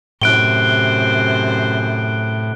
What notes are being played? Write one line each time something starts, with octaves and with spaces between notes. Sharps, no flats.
F#2 A2 C3 C5 F#6 D7 G7